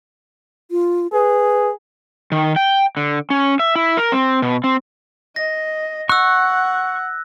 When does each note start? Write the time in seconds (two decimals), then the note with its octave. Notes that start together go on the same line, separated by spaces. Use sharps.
0.71 F4
1.13 G#4 B4
2.32 D#3
2.56 G5
2.97 D3
3.30 C#4
3.59 E5
3.76 E4
3.97 A#4
4.12 C4
4.42 B2
4.64 C4
5.36 D#5 A#6
6.09 F#5 C#6 E6 F#6